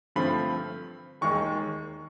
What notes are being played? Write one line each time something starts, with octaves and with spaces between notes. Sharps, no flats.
G2 D3 F3 A3 C4 B5
E1 D#2 D#3 G#3 C#6